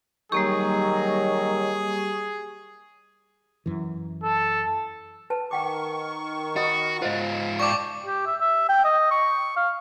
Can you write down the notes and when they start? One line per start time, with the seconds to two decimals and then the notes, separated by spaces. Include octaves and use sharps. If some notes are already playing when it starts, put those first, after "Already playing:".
0.32 D#3 F#3 G3 A#3 G4 G#4 C#6
3.66 F#2 E3
4.23 A4
5.30 B4 A5
5.51 D#3 F#5 G5 C#6 D6
6.56 F#4 D#5 B5 D#6
7.02 G#2 F4 C5 D#5
7.60 D5 G5 A5 C#6 D6
8.06 G4
8.26 E5
8.41 E5
8.69 G5
8.85 D#5
9.11 C#6
9.57 F5